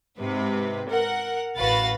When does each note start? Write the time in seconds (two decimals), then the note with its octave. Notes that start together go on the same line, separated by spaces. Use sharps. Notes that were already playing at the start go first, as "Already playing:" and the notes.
0.19 G#2 C3 B4
0.89 A#4 F#5
1.58 A1 F#4 B4 F5 B5 A6